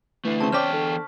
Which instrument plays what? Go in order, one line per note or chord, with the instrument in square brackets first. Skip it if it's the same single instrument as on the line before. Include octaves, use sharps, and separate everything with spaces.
[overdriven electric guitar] D3 A3 [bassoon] E3
[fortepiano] C#3 C4 [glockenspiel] A5 C#6
[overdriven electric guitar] E2 G5 [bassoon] C#4 [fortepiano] C5 D5 D6 [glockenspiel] F6 B6
[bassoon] D3